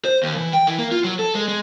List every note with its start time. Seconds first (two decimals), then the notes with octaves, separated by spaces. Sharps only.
0.05 C5
0.23 D#2
0.36 E3
0.53 G5
0.67 E3
0.79 A#3
0.91 F4
1.04 F#3
1.19 A4
1.35 G#3
1.48 G#3